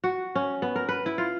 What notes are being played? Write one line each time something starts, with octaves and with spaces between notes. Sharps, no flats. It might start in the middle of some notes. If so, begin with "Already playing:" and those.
F#4
C#4
B3
A#4
B4
E4
F4